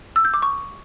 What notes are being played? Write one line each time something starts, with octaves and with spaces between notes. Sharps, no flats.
E6
G6
D6
C#6